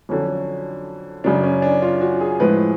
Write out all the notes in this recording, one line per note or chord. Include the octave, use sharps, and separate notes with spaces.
F2 D3 F#3 C#4
F#2 C#3 F#3 D4
C#4
D4
F4
F#4
G#4
A2 F3 G#3 B4